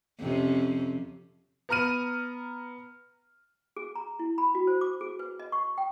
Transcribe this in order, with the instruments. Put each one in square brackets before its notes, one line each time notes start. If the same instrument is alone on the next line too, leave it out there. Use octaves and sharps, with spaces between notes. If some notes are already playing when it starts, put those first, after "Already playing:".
[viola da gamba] F2 C3 C#4
[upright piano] B3 A#5 F6 D#7
[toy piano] G#4
A#5
E4
B5
F#4
C5
D6
G#4
B4
D#5
C#6
G5